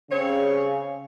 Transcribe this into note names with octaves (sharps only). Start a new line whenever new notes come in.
C#3 G3 C4 C#5